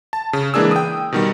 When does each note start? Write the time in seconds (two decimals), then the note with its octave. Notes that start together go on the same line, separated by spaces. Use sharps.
0.13 A5
0.33 C#3
0.54 E3 G#3 A#3 D4 G#4 E6
0.71 G5 D#6
1.12 B2 D#3 G3